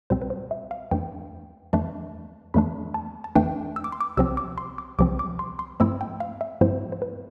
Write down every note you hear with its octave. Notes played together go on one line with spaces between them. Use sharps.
C2 B2 G3 C4 C5
B4
C5
E5
F5
F2 E3 A3 D4 G5
F2 E3 A3 D4 A5
F2 E3 A3 D4 B5
A5
A5
F2 E3 A3 D4 G5
E6
D6
C6
D6
C2 C3 F3 C4 E6
D6
C6
D6
C2 C3 F3 C4 D6
D6
C6
C6
G2 F3 A3 C4 E4 E6
G5
F5
E5
G2 F3 A3 C4 E4 C5
C5
B4